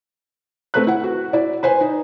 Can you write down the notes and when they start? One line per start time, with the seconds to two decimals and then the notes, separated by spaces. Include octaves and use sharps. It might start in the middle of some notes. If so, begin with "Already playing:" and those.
0.74 A3 C4 B4 F#6
0.87 E4 F#5
1.04 F#4
1.33 E4 D5
1.63 B4 C5 G#5
1.81 D#4